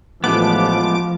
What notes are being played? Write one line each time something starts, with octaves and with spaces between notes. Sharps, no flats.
A1 F3 G#3 A3 B3 D6